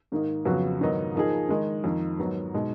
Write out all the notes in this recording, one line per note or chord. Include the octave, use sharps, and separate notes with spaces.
G#2 D#3 A#3 D#4
F2 C#3 F#3 B3 F#4
G#2 D#3 F#3 B3 D#4
F3 A#3 D#4 G#4
D#3 G#3 D#4
F2 D#3 A#3 D#4
G#2 D#3 F#3 B3
B2 G#3 D#4